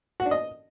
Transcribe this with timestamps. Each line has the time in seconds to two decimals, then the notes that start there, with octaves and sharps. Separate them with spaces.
0.20 F#4
0.25 D4
0.31 D#5